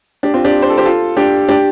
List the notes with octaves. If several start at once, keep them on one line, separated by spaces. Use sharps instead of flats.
D4 G4
C4 F4
D4 G4
C5
A4
G4 C5
F4 A4
D4 G4
D4 G4